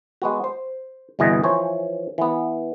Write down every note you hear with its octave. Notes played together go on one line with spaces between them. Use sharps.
G#3 B3 F#4
C5
G1 C2 B2 E3 G#4 D#5
E3 F3 C5 C#5 G#5
E3 B3